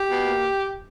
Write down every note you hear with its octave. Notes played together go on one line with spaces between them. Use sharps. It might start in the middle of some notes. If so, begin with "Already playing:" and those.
Already playing: G4
B2
A#3